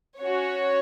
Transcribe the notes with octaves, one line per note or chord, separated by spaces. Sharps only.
C#4 F#4 C#5